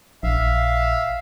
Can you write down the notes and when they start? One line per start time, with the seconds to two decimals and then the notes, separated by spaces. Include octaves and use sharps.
0.23 A#1 E5 F5